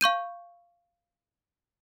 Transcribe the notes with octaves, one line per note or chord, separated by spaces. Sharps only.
F5 C#6 G6 D#7